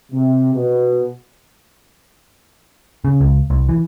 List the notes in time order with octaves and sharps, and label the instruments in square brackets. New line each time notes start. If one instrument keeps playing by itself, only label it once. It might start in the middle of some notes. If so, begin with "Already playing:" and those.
[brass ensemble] C3
B2
[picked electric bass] C#3
C#2
C2
E3